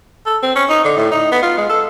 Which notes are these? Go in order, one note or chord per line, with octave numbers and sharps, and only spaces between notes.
A4
C4
C#4
D#4
D3
A2
D#4
B3
F4
G#3
A4